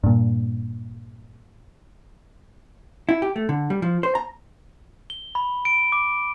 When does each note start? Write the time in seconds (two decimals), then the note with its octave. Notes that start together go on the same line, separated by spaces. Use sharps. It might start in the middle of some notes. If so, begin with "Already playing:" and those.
0.04 G2 A#2
3.09 E4
3.22 G4
3.36 A3
3.49 D3
3.70 G3
3.82 F3
4.03 C5
4.15 A#5
5.10 G7
5.35 B5
5.65 D7
5.92 D6